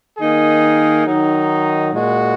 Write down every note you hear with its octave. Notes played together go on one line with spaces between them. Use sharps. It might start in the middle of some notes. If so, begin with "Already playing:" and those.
D#3 A#3 D#4 G#4
D#3 F#3 D#4
A#2 G#3 F#4